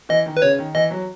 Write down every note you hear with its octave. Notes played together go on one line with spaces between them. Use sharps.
E3 D#5
D#3
B4
C#3 C#5
D#3
E3 D#5
F#3